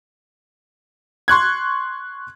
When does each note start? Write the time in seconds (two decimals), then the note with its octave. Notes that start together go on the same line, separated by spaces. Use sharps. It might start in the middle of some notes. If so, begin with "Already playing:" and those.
1.28 C6 C#6 F#6 G#6